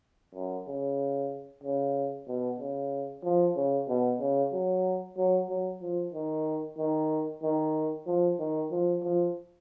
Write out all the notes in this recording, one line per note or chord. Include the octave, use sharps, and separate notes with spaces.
F#2
C#3
C#3
B2
C#3
F3
C#3
B2
C#3
F#3
F#3
F#3
F3
D#3
D#3
D#3
F3
D#3
F3
F3